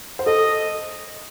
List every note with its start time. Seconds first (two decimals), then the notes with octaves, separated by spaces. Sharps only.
0.19 C5
0.26 A4 D#5